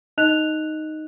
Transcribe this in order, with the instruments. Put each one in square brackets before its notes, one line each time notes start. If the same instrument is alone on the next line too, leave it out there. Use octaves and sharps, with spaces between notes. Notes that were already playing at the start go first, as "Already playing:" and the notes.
[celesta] D#4 D#5 F#6 F7